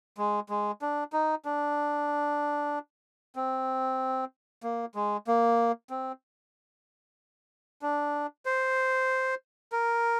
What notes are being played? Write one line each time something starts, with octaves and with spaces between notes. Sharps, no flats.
G#3
G#3
D4
D#4
D4
C4
A#3
G#3
A#3
C4
D4
C5
A#4